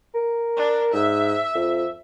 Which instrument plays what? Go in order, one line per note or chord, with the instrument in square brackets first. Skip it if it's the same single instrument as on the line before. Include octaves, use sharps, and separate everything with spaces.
[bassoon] A#4
[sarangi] D4
[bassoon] G#2 [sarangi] E5
[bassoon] F2